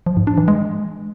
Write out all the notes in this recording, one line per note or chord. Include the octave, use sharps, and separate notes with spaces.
F3
G#2
D4
E3
G#3